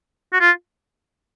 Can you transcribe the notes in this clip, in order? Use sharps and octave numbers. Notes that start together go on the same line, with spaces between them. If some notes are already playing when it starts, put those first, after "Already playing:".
F#4
F4